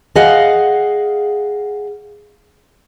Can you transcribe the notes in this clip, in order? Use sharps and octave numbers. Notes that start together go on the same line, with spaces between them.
G#4 D#5 F5 F#5